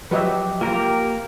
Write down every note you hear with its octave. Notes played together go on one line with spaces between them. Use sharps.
F3 F#3 G4 B4 D#5 E5
A#3 F4 G4 A#4 A#5